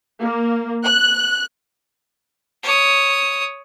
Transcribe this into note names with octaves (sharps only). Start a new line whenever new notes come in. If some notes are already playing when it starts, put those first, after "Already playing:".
A#3
F#6
C#5 D#6